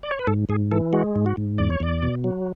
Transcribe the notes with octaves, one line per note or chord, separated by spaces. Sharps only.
D5
C#5
B4
G#2 A4
G#2 G#4
E3 A4
G#3 F#4
G#2
F#4
G#2
E2 D5
C#5
E2 D5
B2
F#3